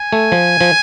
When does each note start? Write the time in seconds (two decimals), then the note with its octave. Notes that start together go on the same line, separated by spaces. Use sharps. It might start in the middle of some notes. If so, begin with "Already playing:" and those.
Already playing: G#5
0.13 A3
0.32 F3
0.61 F3